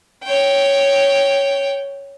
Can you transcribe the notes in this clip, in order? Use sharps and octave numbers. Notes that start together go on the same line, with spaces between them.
C#5 G5